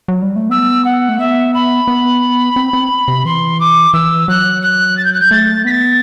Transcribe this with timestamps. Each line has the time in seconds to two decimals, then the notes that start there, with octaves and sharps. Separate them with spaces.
0.08 F#3
0.22 G3
0.36 A3
0.50 B3 E6
0.84 F#5
1.09 A3
1.18 B3 E5
1.53 B5
1.88 B3
2.56 C4
2.73 C4
3.08 C3
3.25 E3 C6
3.60 D6
3.93 E3 E6
4.28 F#3 F#6
4.62 F#6
4.97 A6
5.04 G6
5.13 F#6
5.19 G6
5.31 A3 A6
5.65 B3 B6
5.70 A6